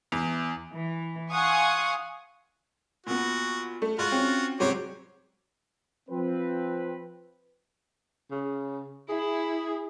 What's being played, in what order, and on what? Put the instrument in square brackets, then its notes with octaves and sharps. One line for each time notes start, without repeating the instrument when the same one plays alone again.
[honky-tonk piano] E2
[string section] E3
F5 F#5 G#5 C6 C#6 D#6
[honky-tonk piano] A#2 B3 [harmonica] F#4
[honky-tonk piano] A3
[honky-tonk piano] G#2 [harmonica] F4 F#4
[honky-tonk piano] C4 C#4
[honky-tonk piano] G#2 C3 F#3 [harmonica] C5 C#5 D6
[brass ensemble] F3 C4 [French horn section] B4
[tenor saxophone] C#3
[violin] E4 [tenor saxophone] G#4